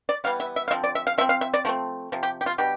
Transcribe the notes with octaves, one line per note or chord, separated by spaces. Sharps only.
D5
E3 G3 B3 F5
E5
E5
F5
D3 F3 C4 E5
D5
E5
F5
F3 C4 E5
F5
E5
D5
F3 A3 C4
C3 F3
G4
G4
F4
B2 G3 D4 G4